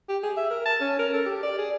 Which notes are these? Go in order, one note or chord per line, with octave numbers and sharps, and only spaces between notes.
G4
G#4
E5
A#4
A5
C#4
A#4
A4
G4
D5
G#4